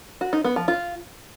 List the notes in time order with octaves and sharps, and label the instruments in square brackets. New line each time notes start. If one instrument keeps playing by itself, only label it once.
[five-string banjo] F#4
D#4
B3
F3
F4